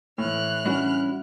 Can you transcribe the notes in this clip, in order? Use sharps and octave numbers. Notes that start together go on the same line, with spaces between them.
A2 E3 F6 F#6
G3 A#3 C#4 D4 E4 F#4